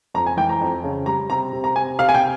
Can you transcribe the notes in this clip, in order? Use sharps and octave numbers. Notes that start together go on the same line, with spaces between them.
F2 A#5
G#5
E3 G5
A#5
F2
C#3
G3 A#5
C3 A#5
C3
A#5
C3 G#5
C3 F5
G#5
G5